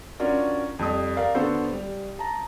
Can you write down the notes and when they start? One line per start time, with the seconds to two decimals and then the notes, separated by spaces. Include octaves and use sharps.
0.20 C#4 D4 F4 F#4 A#4 D5
0.79 F2 G3 D#6
1.17 A#4 D5 F5
1.35 D3 B3 F#4 A4 C5
1.73 G3
2.19 A5 A#5